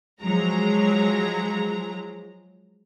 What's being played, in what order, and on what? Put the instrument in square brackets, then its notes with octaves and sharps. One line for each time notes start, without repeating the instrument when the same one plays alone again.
[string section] F3 F#3 G#3 A#5